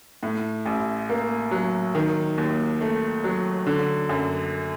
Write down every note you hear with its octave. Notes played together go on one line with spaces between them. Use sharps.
A2
A1
A#3
F#3
D#3
D#2
A3
F#3
D3
F#2